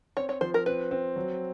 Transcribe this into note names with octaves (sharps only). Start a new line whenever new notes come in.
C4 C#5
C#5
F3 C5
A#4
C4 B4
C4
F#3